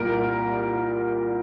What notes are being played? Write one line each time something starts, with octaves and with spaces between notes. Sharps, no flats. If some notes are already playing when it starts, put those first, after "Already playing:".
Already playing: C2 A#2 G3 A#4